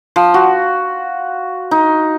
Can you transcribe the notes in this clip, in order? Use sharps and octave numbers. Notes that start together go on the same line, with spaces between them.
F3
F#4
D#4